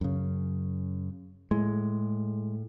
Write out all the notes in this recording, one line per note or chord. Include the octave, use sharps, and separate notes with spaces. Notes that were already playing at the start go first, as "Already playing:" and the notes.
F#2 C#3
A2 G#3